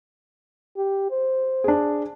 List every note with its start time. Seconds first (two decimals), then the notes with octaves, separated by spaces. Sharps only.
0.77 G4
1.11 C5
1.64 D4 G#4